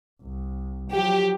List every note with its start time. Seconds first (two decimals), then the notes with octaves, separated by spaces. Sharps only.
0.23 C2
0.91 F3 F#3 G4